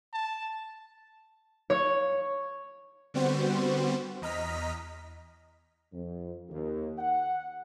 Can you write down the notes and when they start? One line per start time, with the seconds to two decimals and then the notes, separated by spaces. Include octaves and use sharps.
0.13 A5
1.70 C#5
3.14 D3 G3 B3 C4 F#4 C5
4.22 E2 D#5 A#5 F6 B6
5.93 F2
6.49 D#2
6.99 F#5